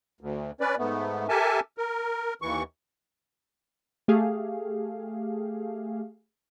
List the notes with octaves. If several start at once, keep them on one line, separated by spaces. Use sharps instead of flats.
D2
C#4 B4 D5
G#2 A3 B3
G4 A4 A#4 E5 G#5 A5
A#4
D#2 E3 C#6
A3 G4 G#4 F5